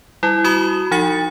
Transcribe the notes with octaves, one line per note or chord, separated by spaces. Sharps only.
G3 E4
F#4 B5 D#6 E7
F3 D#4 F#5 A6 C#7